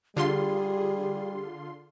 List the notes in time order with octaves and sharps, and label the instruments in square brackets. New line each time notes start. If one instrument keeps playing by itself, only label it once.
[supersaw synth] D3 F4 C6 [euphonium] G3 [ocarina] G4 [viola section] G#4